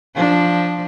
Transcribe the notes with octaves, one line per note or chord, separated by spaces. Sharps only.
F3 D4